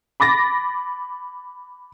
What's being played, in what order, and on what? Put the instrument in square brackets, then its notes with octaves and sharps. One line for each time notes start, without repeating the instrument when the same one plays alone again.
[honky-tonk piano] B5 D6 A6 A#6